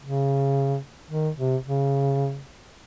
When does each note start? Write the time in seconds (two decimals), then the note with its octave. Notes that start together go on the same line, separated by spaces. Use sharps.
0.03 C#3
1.11 D#3
1.37 C3
1.65 C#3